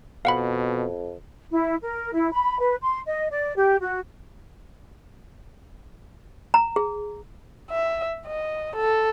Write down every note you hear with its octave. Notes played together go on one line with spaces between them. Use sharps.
F2 B2 F5 F#5 B5
E4
A#4
E4
B5
B4
C6
D#5
D5
G4
F#4
A#5
G#4
E5
D#5
A4